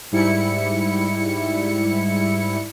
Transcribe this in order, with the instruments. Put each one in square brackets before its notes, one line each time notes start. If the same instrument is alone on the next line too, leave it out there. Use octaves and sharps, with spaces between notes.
[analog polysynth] G#2 G3 E4 C#7